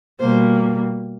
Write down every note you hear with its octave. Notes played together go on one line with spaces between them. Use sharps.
B2 G3 A#3 C5